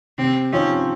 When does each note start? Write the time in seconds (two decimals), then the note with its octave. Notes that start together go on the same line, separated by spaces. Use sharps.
0.18 C3 C4
0.53 F3 C4 C#4 D#4